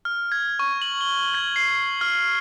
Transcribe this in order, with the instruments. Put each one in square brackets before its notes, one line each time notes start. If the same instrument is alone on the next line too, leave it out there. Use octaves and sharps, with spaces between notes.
[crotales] F6
G#6
C#6
F#7
G7
G#6
C7
F6